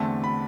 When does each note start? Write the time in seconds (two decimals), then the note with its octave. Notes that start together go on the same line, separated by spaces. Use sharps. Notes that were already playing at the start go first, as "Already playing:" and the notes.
Already playing: E2 D3 A3 C4 A5
0.24 B5